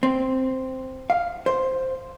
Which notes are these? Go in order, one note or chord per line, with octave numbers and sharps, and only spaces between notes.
C4
F5
C5